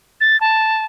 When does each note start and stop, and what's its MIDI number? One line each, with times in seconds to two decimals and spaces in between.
0.21 0.39 93
0.41 0.85 81